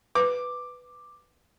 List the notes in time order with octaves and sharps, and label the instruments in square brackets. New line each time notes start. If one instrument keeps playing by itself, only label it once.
[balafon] B4 [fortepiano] D6